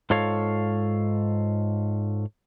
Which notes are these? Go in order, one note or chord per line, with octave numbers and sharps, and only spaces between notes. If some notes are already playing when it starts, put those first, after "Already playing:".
G#2 F4 A4 C#5 F5